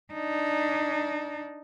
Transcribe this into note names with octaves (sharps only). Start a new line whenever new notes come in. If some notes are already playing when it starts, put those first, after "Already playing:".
D4 D#4